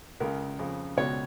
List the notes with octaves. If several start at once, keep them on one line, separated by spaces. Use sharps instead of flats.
C#2 C#3 A#4
F2 C#3
C#2 B2 C#5